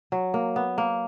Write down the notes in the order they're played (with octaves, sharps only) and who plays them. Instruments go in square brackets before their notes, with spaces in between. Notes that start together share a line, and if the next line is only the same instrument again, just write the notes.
[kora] F#3
A#3
B3
A#3